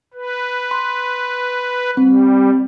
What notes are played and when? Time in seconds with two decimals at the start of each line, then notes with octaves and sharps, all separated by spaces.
0.14 B4
0.71 C6
1.97 G3 C4